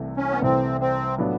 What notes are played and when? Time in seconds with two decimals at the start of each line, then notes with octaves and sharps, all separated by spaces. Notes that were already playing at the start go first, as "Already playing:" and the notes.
Already playing: C2 C3 E3 A3
0.17 C#4
0.31 B3
0.42 C2 C3 E3 A3 C4
0.81 C4
1.18 A2 F#3 B3 D4 F4